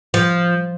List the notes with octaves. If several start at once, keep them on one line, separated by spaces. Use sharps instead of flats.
F3